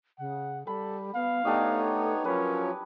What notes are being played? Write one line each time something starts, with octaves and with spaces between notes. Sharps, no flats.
C#3 F#5
G3 A4 B5
B3 F5
A3 B3 D4 D#4 G4 C#5 D#5
F3 F#3 C#4 A#4 B4